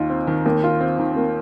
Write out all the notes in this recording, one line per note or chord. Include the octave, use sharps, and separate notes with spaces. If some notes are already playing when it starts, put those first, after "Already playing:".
Already playing: D#2 D#4 F4
C4
D#3
D#2 A#3
F4
C4
D#3
C4
A#3